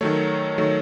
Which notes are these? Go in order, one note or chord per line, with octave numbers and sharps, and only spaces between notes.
D#3 F#3 A3 C#5
D#3 F#3 A3